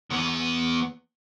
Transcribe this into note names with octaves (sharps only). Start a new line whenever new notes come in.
E2 B3